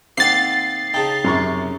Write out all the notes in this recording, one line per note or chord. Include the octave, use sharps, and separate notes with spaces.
D#3 A#3 C4 F#5 A6 C7
C#3 D#4 G5 A5
F#2 C3 A#5 C#6